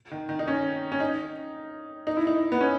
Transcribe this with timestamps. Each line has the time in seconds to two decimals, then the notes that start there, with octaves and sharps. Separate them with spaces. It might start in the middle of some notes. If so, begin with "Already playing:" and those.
0.12 D#3
0.29 D#3
0.39 D#4
0.48 C#4
0.92 C#4
1.00 D#4
2.07 D#4
2.17 E4
2.27 D#4
2.52 B3
2.61 C#4